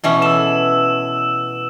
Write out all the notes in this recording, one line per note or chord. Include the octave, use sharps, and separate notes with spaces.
B2 E3 C#4
A4 E6 E7